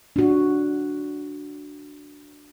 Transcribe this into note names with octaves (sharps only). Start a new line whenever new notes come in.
D4 F#4